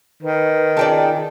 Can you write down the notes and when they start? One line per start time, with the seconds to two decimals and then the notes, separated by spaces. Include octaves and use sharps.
0.22 D#3 B4
0.77 C#4 F4 G#4 D5 G5 A5